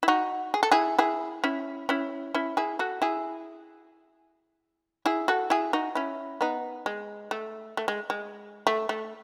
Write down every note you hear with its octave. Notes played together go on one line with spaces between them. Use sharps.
E4
D#4 F#4
G#4
A4
E4 G#4
E4 G#4
C#4 E4
C#4 E4
C#4 E4
E4 G#4
F#4 A4
E4 G#4
E4 G#4
F#4 A4
E4 G#4
D#4 F#4
C#4 E4
B3 D#4
G#3
A3
A3
G#3
G#3
A3
A3